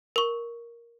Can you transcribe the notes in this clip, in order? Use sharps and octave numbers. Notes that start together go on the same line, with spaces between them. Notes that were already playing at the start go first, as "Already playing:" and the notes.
A#4 C#6